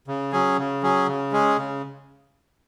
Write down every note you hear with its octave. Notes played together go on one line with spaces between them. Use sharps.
C#3
F#3 C#4 G#4
C#3
F#3 C#4 G#4
C#3
G#3 C#4 G#4
C#3